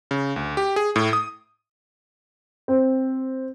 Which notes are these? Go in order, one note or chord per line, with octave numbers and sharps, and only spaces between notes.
C#3
D2
G4
G#4
A2
D#6
C4